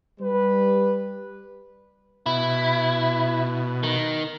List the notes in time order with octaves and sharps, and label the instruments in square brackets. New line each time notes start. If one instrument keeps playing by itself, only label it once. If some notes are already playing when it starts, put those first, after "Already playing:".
[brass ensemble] G3 B4
[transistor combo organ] B2 [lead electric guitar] E4
[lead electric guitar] D#3